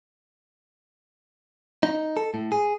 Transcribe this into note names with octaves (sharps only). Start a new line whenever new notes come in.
D#4
A4
A2
G#4